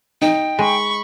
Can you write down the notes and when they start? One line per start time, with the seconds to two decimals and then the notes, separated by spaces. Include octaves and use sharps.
0.22 D#4 G5
0.59 G#3 B5 C#6